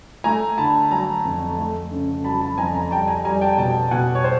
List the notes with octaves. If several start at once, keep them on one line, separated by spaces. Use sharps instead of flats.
A3 G#5 A#5
D3 A5 B5
F#3 G#5 A#5
F2
A3
C#3
F#3 A5 B5
A5 B5
F2 G#5 A#5
G#5 A#5
G3 G5 A5
G#5 A#5
G3 G#5 A#5
G5 A5
B2 G5 A5
B2 F#5 G#5
C#5
C5